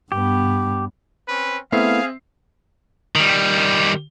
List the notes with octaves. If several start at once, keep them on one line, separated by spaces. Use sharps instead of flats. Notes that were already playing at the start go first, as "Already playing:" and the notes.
G2 B3 G4
C4 C#4 B4
A3 B3 C4 E4 G#4 E5 F5 C7
D#3 G3